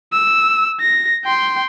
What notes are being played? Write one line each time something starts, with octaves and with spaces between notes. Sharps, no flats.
E6
A#6
G5 C6